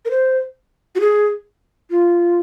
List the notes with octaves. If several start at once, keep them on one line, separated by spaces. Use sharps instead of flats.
A#4
C5
F#4
G#4
F4